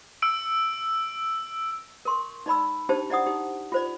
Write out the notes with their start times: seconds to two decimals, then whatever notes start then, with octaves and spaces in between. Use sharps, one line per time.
0.22 E6 D7
2.05 A#4 C6 C#6
2.46 D#4 D5 B5 E6
2.89 D4 D#4 G4 C5 A5
3.10 E4 D5 F#5 D#6
3.26 D#4 G4
3.72 F4 C5 D5